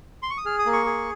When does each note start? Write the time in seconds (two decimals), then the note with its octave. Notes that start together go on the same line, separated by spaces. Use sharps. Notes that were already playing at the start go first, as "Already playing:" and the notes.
0.23 C6
0.30 C#6
0.38 D#6
0.45 G#4 F6
0.59 D#6
0.66 A#3
0.73 C#6
0.86 G#4